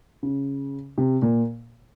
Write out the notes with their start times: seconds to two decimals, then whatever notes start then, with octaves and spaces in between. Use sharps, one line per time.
0.23 C#3
0.98 C3
1.22 A#2